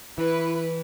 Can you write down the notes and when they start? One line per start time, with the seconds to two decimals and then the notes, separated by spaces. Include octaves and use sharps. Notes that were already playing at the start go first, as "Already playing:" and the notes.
0.18 E3 E4 B4